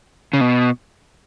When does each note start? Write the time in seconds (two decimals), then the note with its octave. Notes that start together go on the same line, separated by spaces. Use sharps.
0.33 C#3
0.41 B2